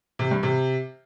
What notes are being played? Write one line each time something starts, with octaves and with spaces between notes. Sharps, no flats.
C3
G2
C3